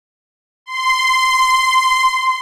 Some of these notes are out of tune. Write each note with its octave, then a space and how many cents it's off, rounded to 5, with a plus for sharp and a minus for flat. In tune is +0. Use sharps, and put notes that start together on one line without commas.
C6 -15